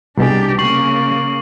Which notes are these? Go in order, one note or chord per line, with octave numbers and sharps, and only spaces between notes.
C2 B2 D4 G4 G#4
C#3 A#3 C#6 C7 F#7